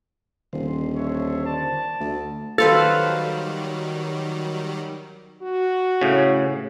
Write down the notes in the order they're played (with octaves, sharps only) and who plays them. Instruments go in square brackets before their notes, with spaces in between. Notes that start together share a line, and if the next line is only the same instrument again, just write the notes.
[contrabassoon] D#1 [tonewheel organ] D3 D#3 C5
[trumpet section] D4 C#5 E5
D5 A5
[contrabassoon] D2
[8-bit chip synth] D#3 F#3 G3 [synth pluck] A4 [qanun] B4 C5 F5
[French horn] F#4
[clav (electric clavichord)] A2 C#3